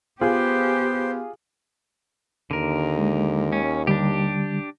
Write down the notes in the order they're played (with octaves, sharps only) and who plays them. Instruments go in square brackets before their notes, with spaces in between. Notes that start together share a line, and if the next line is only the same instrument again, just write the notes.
[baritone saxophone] B3 [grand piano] F4 G#4 [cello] G4 [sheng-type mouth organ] C5
[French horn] D#2 [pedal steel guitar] D3 A#4
[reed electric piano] G#3
[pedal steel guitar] C#4
[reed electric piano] D3 G3 [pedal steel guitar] D4 G4